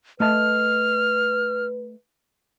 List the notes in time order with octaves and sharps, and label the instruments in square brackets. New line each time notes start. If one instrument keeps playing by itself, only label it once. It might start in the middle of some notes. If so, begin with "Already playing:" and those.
[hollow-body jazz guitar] A3 D#5 A5 [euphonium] B4 [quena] F6